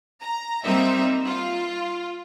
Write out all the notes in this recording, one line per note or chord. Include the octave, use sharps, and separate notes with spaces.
A#5
G3 A#3 C4 D#4 E5
F4